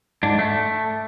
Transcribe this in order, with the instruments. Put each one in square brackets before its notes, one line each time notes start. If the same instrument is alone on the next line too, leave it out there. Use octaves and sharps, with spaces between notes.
[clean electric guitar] G#2 D4
A3